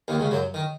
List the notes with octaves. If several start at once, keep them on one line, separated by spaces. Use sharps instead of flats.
D#2 D#3
C#2 C#3
F#2 F#3
D#3